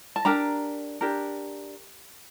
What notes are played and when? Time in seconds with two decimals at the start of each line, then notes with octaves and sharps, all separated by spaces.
0.16 A5
0.25 D4 G4 A#4 A#5
1.01 D4 G4 A#4